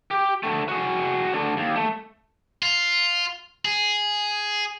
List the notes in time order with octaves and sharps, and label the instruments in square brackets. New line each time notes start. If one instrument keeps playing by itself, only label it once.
[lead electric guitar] G4
D3 A3
F#4 G#4
D3 A3
D#2
A3
[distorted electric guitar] F4
G#4